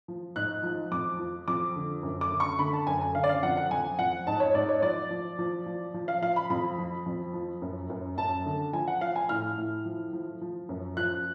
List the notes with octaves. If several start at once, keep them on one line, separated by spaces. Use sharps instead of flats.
F3
G#2 F#6
F3
F2 D6
F3
F2 D6
D3
F#2
D6
D3
C#6
D3 B5
A5
F#2 G#5
G#5
D3 F5
D5
F5
F2 F#5
F#5
F2 G#5
F2 F#5
G#2 A5
C#5
G#2 D5
C#5
F3 D5
F3
F3
F3
F3
F5
F3 F5
B5
F2 B5
F3
F2
F3
F#2
F#2
F#2 A5
D3
F3 G#5
F#5
F3 F5
G#5
A2 F6
A2
F3
F3
F3
F#2
F3 F#6